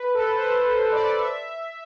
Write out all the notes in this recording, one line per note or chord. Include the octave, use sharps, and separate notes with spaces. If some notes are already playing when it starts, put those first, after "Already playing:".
Already playing: B4
A4
C5
B4
C5
D5
E5